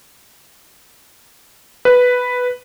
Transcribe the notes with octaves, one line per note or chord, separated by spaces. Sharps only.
B4